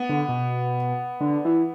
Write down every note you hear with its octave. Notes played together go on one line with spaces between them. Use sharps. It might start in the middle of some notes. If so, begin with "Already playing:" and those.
Already playing: B3
D3
B2
D3
E3